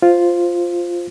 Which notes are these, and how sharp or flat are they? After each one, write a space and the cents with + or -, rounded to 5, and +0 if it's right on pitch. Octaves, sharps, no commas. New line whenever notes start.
F4 +0 C5 +0